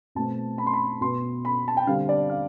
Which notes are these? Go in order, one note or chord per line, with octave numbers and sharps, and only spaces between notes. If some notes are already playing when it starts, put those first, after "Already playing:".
B2 A3 C4 A5
B5
C6
B5
B2 B3 C6
B5
A5
G5
D3 G3 C4 F5
D5
F5